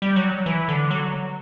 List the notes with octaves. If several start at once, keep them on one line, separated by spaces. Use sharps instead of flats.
G3
F#3
E3
D3
F#3